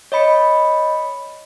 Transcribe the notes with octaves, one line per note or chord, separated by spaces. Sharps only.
C#5 D#5 B5 C#7